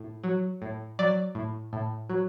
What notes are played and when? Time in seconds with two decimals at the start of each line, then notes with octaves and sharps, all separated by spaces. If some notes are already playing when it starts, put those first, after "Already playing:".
Already playing: A2
0.24 F#3
0.62 A2
0.99 F#3 D5
1.35 A2
1.73 A2
2.10 F#3